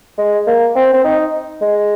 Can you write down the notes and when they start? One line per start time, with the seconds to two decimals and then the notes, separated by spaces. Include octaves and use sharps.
0.18 G#3
0.47 A#3
0.75 C4
0.94 C4
1.04 D#4
1.62 G#3